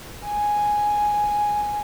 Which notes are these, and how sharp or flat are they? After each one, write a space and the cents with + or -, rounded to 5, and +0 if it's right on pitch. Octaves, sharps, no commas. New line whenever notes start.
G#5 +0